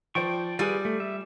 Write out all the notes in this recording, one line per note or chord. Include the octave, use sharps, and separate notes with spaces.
F3 C5 D5 G5 C#6
G3 F4 G#4 B4 A6
A3
E5